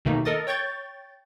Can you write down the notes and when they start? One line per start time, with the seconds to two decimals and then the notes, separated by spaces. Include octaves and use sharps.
0.05 D#2 B2 D#3 A3 A#3 D#4
0.25 A4 A#4 D#5 D#6 A6
0.47 C#5 G5 C#6 G6 A6